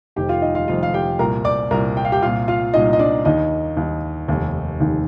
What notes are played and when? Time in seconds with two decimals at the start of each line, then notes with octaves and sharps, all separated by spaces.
0.16 F1 F2 D#3 G4 G5
0.29 F4 F5
0.42 D#4 D#5
0.55 F4 F5
0.68 F1 F2 D#3 F4 F5
0.83 F5
0.94 G4 G5
1.19 C2 A#2 A#4 A#5
1.45 D5 D6
1.71 C2 A#2 A#4 A#5
1.97 G5
2.05 F5
2.12 G4 G5
2.22 C2 A#2 F4 F5
2.48 F4 F5
2.74 C2 A#2 D#4 D#5
2.93 D#5
2.99 D4 D5
3.25 D#2 D#3 D#4 D#5
3.77 D#2 D#3
4.28 F1 D#2 D#3
4.80 F1 D#2 D#3